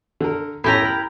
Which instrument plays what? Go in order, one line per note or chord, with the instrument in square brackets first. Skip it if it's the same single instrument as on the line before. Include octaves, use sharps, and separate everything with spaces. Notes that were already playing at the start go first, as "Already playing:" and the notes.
[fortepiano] D3 A#4
[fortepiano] A2 D#3 C#4 [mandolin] E4 G4 A#5
[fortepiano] A#4 B5